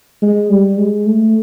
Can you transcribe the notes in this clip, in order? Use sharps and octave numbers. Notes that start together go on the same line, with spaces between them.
G#3
G3
G#3
A3